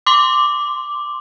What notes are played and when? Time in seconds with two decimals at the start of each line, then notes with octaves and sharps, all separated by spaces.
0.06 C6 D6